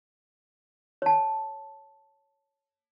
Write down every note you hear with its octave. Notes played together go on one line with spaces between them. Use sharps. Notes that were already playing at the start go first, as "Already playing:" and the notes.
C#5 A5